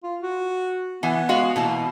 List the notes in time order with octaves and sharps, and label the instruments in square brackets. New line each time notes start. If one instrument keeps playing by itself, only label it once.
[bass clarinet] F4
F#4
[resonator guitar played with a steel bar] E3 [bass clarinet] B3
[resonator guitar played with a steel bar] G#3 F#4 F5
[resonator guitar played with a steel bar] B2 E3 A5 [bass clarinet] A#3